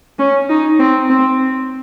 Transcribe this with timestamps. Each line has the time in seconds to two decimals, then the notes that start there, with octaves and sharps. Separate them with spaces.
0.19 C#4
0.49 D#4
0.79 C4
1.10 C4